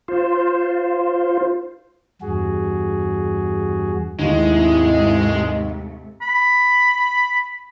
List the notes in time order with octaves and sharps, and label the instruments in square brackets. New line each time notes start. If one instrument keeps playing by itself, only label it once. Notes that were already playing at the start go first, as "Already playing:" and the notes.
[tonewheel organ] F4 C5
[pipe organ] E2 G2 F#4 G#4
[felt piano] D#2 [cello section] G#2 C3 A3 [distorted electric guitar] G#3 [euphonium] E4
[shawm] B5